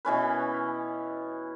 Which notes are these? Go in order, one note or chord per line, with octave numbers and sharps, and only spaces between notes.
B2 E3 C#4 B4